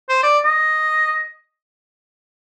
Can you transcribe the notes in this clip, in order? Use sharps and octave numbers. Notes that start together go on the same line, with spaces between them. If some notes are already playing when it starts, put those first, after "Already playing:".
C5
D5
D#5